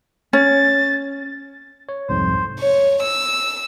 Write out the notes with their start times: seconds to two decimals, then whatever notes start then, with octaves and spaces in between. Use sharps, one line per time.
0.33 C#4 A6
1.89 C#5
2.09 C2 F2 G#2 C5
2.60 C#5
3.03 E6